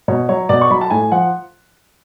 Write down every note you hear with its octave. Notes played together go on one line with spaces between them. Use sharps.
B2 C#5
F#3 C#5
B2 D5
C#6
F#3 B5
A5
A2 G#5
F3 F#5